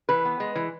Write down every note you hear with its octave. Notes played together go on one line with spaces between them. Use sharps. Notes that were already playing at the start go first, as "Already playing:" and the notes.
E3 B4
B3
G#3
E3